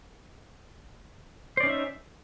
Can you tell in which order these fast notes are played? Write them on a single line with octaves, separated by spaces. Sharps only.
C5 D5 C#4 D#4 E5